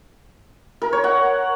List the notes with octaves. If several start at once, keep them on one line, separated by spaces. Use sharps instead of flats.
A#4
C#5
F#5